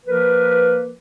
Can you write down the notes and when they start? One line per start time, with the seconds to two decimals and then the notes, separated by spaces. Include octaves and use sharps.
0.06 F3 A#3 A#4 B4